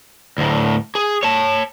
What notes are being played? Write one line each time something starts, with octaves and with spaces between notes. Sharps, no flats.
D2 A2
G#4
C#5 A5